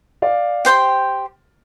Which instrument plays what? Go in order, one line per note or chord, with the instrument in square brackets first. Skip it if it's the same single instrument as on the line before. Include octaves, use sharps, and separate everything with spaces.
[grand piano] D5 F5
[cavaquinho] G4 C5 G5 C6